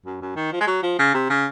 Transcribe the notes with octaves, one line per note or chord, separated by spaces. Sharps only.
F#2
F#2
D#3
F3
G#3
F#3
F3
C#3
C3
C#3